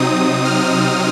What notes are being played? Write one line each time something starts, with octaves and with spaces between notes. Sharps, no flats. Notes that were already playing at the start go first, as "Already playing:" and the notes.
Already playing: C3 F#3 C4 D#4 D#6
F6